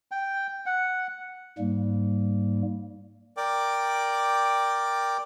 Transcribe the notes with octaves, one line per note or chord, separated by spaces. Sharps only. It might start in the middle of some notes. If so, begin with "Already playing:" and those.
G5
F#5
G#2 G3 A#3
A#4 D5 G5 D6